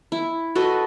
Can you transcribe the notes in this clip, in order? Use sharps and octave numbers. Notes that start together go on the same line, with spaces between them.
E4
F#4 A4 B4 D#5